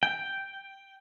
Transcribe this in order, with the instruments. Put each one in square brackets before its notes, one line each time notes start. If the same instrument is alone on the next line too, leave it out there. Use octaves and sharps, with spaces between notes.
[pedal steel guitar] G5